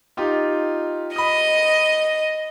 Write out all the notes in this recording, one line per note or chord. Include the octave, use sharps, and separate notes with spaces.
D#4 F4 G4
D#5 B5 D#6